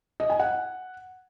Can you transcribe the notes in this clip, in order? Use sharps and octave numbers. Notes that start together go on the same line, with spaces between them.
D#5
G#5
F#5